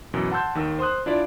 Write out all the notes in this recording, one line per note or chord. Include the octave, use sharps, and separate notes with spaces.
F#2 B2 E3
F#5 A5 C6 E6 G6
D#2 D#3 E6
C5 C6 D#6 F#6
D4 E4 F4 D5